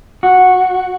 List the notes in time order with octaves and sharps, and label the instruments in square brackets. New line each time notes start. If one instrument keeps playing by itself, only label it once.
[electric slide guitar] F#4